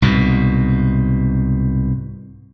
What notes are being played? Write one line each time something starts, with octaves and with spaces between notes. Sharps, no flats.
C2 G#2 B2